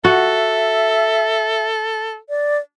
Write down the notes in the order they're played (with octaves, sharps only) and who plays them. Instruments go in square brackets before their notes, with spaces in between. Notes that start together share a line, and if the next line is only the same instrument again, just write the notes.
[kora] F#4 [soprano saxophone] A4 [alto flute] E5
[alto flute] D5